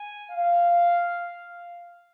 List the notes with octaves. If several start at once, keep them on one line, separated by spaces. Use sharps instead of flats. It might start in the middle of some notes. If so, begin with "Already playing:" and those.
Already playing: G#5
F5